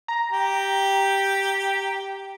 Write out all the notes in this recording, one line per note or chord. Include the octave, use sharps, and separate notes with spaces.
A#5
G4 G5